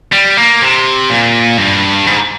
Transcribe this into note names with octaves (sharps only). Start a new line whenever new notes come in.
G3
A#3
C3
A#2
G2
G#2